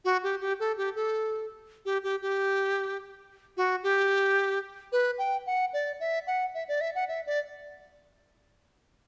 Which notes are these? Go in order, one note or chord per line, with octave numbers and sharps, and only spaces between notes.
F#4
G4
G4
A4
G4
A4
G4
G4
G4
F#4
G4
B4
G5
F#5
D5
E5
F#5
E5
D5
E5
F#5
E5
D5